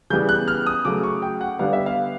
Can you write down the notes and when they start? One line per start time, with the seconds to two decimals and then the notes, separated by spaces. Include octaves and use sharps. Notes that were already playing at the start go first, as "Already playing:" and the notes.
0.10 C#3 E3 G3 B3 G6
0.29 F#6
0.48 F6
0.66 D#6
0.85 C#3 F#3 A3 D6
1.03 C#6
1.22 G5
1.41 F#5
1.59 D3 G3 B3 F5
1.73 E5
1.86 F5